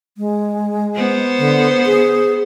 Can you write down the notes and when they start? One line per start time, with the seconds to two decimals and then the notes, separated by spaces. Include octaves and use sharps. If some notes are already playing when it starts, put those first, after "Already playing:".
0.18 G#3
0.96 B3 C5
1.38 D3
1.86 G#4